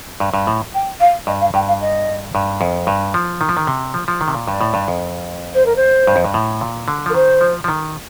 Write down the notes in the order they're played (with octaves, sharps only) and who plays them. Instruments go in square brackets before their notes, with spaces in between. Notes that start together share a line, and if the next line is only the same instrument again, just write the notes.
[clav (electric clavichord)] G2
G2
A2
[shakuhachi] G5
F5
[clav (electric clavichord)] G2 [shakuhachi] D#5
[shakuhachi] F5
[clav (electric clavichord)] G2 [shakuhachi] G5
[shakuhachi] F5
D#5
[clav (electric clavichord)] G2
F2
G2
F3
D#3
F3
D#3
C3
F3
F3
D#3
C3
A#2
[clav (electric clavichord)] G2 [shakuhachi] D5
[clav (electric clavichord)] A2
G2
F2
[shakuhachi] C5
A#4
C5
[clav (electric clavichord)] G2
F2
G2
A2
A#2
D3
F3
[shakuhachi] A#4
[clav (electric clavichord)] D#3 [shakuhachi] C5
[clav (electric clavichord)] F3
F3
D#3